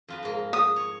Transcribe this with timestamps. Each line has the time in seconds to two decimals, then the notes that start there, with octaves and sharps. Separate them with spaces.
0.08 F2 F4 B4
0.23 G#2 A#3
0.53 D#6
0.76 C#5